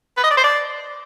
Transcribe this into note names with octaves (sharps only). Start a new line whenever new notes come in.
B4
D#5
D5
C5
D5